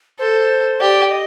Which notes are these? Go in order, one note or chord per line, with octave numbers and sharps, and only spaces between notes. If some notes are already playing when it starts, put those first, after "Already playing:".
A4 C5
G4 D5
D#5